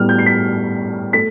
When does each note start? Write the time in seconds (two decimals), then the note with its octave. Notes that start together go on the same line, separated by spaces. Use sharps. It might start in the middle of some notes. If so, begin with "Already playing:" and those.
Already playing: A2 G3 B3 F6
0.09 G6
0.19 C7
0.26 B6
1.13 A3 B6